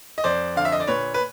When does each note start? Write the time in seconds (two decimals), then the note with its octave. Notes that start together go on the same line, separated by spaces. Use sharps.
0.18 D#5
0.24 F2 C5 D5
0.56 D3 F5
0.65 E5
0.72 D#5
0.80 D5
0.87 A#2 B4 C#5
1.14 B4